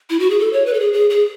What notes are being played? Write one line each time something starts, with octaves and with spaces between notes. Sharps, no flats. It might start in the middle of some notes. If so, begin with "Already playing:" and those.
E4
F#4
G#4
A4
C#5
B4
A4
G#4
G#4
G#4